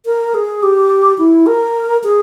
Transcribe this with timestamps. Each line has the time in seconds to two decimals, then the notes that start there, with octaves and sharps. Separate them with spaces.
0.06 A#4
0.34 G#4
0.63 G4
1.18 E4
1.46 A#4
2.04 G#4